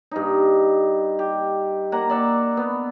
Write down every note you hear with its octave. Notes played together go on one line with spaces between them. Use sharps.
G2 D#4
G4
A#3 F#5 A#5
D5 E5 F#5
B3